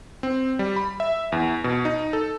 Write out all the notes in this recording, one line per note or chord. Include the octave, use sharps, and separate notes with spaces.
C4
G3
B5
E5
E2
B2
D#4
A4